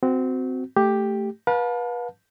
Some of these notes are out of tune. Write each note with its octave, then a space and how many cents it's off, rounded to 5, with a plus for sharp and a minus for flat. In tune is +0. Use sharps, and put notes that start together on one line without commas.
C4 -20 F#4 +0
A3 +0 G4 +5
B4 -30 F5 +40 A5 +0